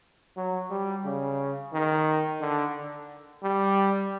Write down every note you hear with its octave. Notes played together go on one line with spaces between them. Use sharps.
F#3
G3
C#3
D#3
D3
G3